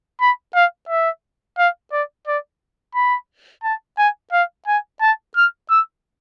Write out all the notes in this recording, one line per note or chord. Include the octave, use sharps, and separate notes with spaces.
B5
F5
E5
F5
D5
D5
B5
A5
G#5
F5
G#5
A5
F6
E6